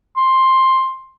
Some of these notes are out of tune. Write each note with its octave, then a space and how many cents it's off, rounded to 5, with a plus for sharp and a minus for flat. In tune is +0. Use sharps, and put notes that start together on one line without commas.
C6 +10